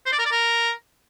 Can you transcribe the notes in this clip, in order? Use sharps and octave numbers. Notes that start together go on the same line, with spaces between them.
C5
D5
A#4
D5
A#4